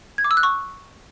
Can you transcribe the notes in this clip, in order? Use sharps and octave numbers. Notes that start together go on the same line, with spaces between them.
G#6
D6
E6
F#6
C#6